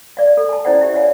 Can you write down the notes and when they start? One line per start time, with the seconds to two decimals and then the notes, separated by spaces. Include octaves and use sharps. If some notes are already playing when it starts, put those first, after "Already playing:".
0.17 D5 F5
0.37 A4
0.49 G#5 A5
0.65 C#4 E4 C5 D5 F#5
0.81 G4 E5
0.94 C#5 D5 F5 F#5 G#5